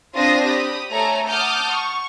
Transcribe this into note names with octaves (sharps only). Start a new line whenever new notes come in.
C4 D4 F4 C6 D#6 A#6
G4 B5 D#6
A3 A4 C#5 G#5 A#5
F#5 A5 D6 D#6 F6 G6
C#6